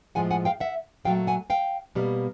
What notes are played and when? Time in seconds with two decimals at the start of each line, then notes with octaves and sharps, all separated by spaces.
0.15 A2 F3 G#3 F#5 G#5
0.31 F#5 G#5
0.45 F5 G5
0.60 E5 F#5
1.05 A#2 F#3 A3 F5 G5
1.27 F#5 G#5
1.50 F5 G5
1.95 B2 G3 A#3